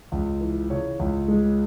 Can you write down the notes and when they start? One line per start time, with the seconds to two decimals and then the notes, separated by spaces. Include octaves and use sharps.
0.12 C#2
0.41 E3
0.70 C#3 C#5
0.99 C#2
1.28 G#3